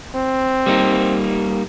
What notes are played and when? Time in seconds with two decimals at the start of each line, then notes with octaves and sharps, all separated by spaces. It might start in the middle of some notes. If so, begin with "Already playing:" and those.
0.15 C4
0.66 G3 A#3 D#4